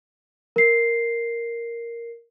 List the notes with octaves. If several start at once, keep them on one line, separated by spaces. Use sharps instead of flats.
A#4 C7